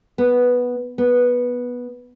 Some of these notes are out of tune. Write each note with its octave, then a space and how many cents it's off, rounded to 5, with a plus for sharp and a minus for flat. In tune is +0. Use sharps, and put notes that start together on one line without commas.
B3 -5
B3 -10